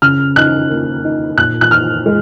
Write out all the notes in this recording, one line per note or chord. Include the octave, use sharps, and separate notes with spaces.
C#3 F6
D#4 F#6
A#3
D#4
A#2 F#6
F#6
D#4 F6
G#3